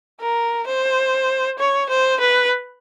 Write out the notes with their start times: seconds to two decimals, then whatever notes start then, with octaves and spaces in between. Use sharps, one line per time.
0.21 A#4
0.67 C5
1.59 C#5
1.89 C5
2.20 B4